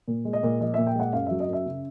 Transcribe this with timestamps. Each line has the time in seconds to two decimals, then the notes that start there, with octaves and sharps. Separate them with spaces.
0.08 A#2
0.25 G#3
0.33 D#5
0.43 A#2
0.61 F3 D#5
0.74 A#2 E5
0.87 G5
0.95 G#3 F#5
1.13 F#2 F5
1.26 F#3 E5
1.40 D#5
1.48 F#2 E5
1.66 C#3